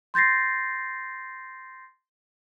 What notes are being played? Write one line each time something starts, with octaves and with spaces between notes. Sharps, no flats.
C6 G6 A6 A#6 C7